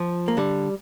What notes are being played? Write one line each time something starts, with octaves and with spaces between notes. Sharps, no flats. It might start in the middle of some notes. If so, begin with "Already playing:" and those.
Already playing: F3
A#3
D3 G3